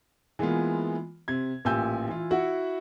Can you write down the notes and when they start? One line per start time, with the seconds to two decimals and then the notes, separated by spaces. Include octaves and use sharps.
0.39 E3 G#3 A#3 B3 F4
1.28 C3 G#6
1.65 A1 A#2 G4 G#5 E6 G6
2.08 E3 F4
2.31 E4 F#4 F#5